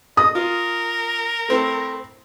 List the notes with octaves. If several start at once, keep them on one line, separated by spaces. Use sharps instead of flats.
D#5 D#6
F4 A#4
A3 C4 E4